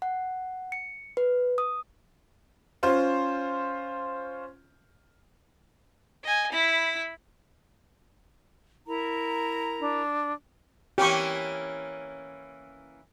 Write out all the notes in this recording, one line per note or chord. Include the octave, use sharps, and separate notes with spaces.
F#5
C#7
B4
D#6
C#4 F4 C5
D#5 G#5
E4 B5
E4 A#4 A#5
D4
E3 A#3 C#4 G4 C#6